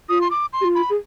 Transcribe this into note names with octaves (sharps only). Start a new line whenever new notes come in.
F4 D#6
C6
D6
C6
G4
F4
B5
G#4